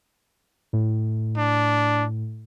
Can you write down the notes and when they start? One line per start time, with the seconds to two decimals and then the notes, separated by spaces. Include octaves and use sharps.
0.73 A2
1.37 D4